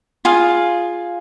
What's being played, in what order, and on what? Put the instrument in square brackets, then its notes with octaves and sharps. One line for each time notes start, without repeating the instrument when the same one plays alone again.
[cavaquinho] F4 G#4 F5